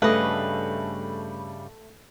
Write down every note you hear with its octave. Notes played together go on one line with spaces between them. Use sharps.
G2 C#3 G3 A3 B4 D#5